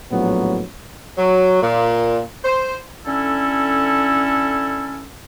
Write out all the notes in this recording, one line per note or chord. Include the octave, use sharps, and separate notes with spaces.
A#1 A2 F#3 B3
F#3
A#2
C5
D3 C#4 E4 A4